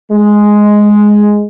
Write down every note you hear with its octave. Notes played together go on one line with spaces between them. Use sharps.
G#3